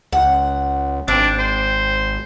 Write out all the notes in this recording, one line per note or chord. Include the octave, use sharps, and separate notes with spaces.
C#2 F#5
G#1 C4 D4
C5